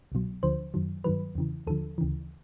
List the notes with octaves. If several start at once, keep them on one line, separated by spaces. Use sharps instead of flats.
C2 B2 F#3
D2 D3 F3 C5
F#2 D#3 F#3
G2 D#3 F#3 B4
E2 C#3 E3
D#2 D3 F3 A4
D2 C#3 E3